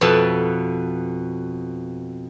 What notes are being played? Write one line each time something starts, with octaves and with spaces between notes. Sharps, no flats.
F2 B2 B3 E5 A5